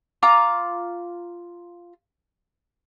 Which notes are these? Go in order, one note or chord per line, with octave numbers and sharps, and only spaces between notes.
F4 A#5 D6